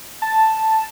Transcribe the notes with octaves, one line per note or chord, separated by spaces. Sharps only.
A5